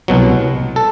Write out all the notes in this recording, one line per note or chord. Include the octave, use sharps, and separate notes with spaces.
C2 B2 F#3
A4